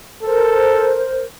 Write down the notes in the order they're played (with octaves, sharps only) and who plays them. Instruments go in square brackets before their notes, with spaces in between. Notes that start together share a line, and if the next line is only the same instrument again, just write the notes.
[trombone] A4 [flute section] A#4 C5